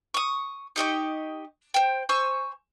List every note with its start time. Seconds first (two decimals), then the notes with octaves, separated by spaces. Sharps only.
0.14 C#6 D#6
0.76 D#4 G4 D#5 C#6
1.74 C5 G5
2.09 C5 G#5 C#6 E6